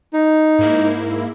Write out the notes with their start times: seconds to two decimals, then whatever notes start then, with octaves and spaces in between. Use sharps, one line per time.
0.13 D#4
0.59 G#2 A#3 E4